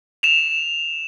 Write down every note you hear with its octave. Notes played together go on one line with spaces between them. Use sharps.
E7 F7